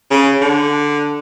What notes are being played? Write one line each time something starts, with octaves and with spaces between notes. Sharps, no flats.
C#3
D3